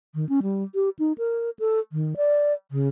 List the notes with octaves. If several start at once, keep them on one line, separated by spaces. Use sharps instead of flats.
D#3
C#4
G3
G4
D#4
A#4
A4
D#3
D5
C#3